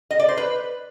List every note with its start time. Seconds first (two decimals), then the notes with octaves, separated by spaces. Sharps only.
0.11 D#5
0.19 D5
0.28 C5
0.37 B4